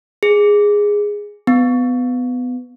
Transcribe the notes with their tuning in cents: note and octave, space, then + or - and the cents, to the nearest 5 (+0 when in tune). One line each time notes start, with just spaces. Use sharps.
G#4 -10
B3 +20